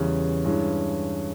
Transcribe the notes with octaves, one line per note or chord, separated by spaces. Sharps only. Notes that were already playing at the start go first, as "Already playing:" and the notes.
Already playing: E2 C#3 G3 C#4
G2 E3 G#3 C#4